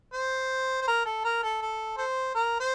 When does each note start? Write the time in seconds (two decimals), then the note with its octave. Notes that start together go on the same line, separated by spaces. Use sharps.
0.13 C5
0.81 C5
0.87 A#4
1.05 A4
1.24 A#4
1.43 A4
1.61 A4
1.98 A4 C5
2.35 A#4
2.60 C5